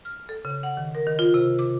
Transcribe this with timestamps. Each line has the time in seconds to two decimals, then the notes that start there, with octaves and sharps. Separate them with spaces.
0.05 F6
0.29 A4
0.45 C#3
0.63 F#5
0.77 D#3
0.95 A#4
1.07 D#3
1.19 F4
1.34 C3
1.59 D6